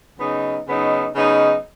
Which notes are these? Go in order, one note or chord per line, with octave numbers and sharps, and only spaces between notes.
C#3 F#3 B3 D#4
C#3 F#3 B3 D#4
C#3 F#3 B3 D#4